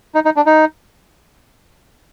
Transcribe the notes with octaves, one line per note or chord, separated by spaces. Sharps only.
D#4
D#4
D4
D#4